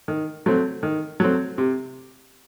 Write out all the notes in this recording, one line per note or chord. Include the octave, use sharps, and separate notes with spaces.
D#3
F#3 A3 C4
D#3
F#3 A3 C4
C3